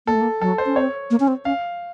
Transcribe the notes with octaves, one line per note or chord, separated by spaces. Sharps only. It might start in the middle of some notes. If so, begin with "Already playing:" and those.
A#3 A4
A3
A#3
F#3 A4
C5
C#4
C4 C#5
A#3
C#4
C4
C#4 F5